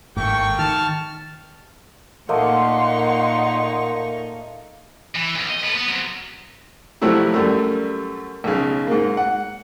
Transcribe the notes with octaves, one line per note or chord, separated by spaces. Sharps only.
G#1 G#2 A3 A#3 G5 C#6
D#3 A5 F6
A#2 A3 A#3 D#4 D#5 F#5 C6 C#6
E3
B1
D#5
A4 B4
B3
F#3 C4
C3 F3 F#3 A3 E4 G4
F#2 G3 A3
B1 C#3
G#2 A#3
F#5